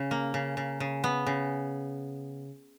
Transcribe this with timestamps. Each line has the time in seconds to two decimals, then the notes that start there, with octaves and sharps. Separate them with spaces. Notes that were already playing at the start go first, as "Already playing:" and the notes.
Already playing: C#3
0.11 A#3
0.34 C#3
0.57 C#3
0.80 C#3
1.04 B3
1.26 C#3